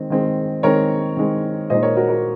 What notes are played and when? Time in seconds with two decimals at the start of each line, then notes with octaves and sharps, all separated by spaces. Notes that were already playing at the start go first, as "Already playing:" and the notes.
Already playing: D#3 G#3 C4
0.10 D#3 G#3 C4
0.63 D#3 G#3 C4 A#4 C#5
1.17 D#3 G#3 C4
1.70 A#2 G#3 D#4 C5 D#5
1.83 A#4 C#5
1.96 F#4 A#4
2.09 F#4 A#4